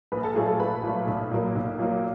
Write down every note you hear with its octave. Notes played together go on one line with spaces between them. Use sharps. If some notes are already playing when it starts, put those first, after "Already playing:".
A#1 B4 B5
A4 A5
A#2 F#3 A3 G#4 G#5
A4 A5
A#1 B4 B5
A#2 F#3 A3
B1
A#2 F#3 A#3
B1
A#2 F#3 A#3